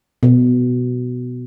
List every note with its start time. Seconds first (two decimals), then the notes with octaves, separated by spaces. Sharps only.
0.23 B2